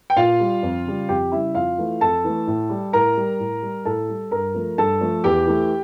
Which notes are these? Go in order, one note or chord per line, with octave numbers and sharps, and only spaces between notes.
G5
A#2 F4 F5
G3
F2
C#3 G3
F2 G4 G5
C#3 G3 E4 E5
F2 F4 F5
E3 A3
F2 A4 A5
E3 A3
A2
G3
A2 A#4 A#5
G3
A2
G3
A2 A4 A5
G3
G2 A#4 A#5
F3 A3
G2 A4 A5
F3 A3
E2 G4 G5
E3 A3